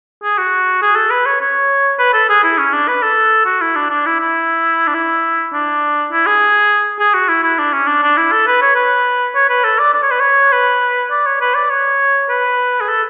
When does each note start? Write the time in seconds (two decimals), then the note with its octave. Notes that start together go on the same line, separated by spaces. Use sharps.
0.23 G#4
0.38 F#4
0.82 G#4
0.96 A4
1.10 B4
1.25 C#5
1.40 C#5
1.99 B4
2.13 A4
2.29 G#4
2.44 E4
2.58 C#4
2.73 D4
2.88 B4
3.02 A4
3.46 F#4
3.61 E4
3.75 D4
3.90 D4
4.05 E4
4.20 E4
4.87 D4
4.94 E4
5.53 D4
6.11 E4
6.26 G#4
6.99 G#4
7.14 F#4
7.28 E4
7.43 E4
7.58 D4
7.73 C#4
7.87 D4
8.03 D4
8.17 E4
8.32 A4
8.47 B4
8.62 C#5
8.75 B4
9.35 C#5
9.49 B4
9.64 A4
9.79 D5
9.93 D5
10.03 C#5
10.11 B4
10.20 C#5
10.52 B4
11.11 D5
11.26 C#5
11.41 B4
11.55 D5
11.70 C#5
12.29 B4
12.81 G#4
12.88 A4